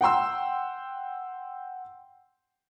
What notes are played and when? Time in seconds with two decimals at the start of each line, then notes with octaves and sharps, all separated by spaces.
0.01 F#5 G5 C6 E6